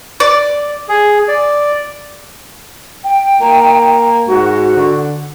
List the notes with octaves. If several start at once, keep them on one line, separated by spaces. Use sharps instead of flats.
D5
G#4
D5
G5
A#3
G#2 F#4
D3